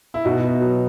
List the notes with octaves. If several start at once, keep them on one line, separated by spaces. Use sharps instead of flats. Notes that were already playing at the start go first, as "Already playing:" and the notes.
E4
B2 D#4 F#4
B3
F#3